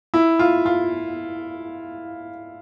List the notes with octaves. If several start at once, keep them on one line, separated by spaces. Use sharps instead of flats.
E4
F4
F4